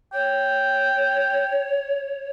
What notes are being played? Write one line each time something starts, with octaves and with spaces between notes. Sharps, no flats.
C#5 G5